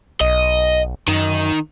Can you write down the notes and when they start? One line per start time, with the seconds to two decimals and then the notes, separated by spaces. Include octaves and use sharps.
0.21 B1 D#5
1.08 F#2 D#3 D#4